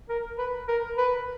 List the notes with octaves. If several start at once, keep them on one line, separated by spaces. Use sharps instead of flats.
A#4
B4
A#4
B4